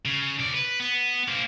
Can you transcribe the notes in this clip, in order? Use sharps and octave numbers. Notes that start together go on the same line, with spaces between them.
C#3
B1 D5
B4
B3
A#3 C5